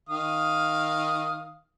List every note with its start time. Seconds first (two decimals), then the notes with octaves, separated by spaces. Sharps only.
0.09 D#3 F5 D#6